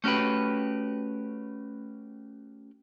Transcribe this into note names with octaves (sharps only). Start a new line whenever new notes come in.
A3 C#4 F#4 G4 B4